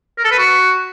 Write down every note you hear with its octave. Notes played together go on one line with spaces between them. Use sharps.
A#4
A4
B4
F#4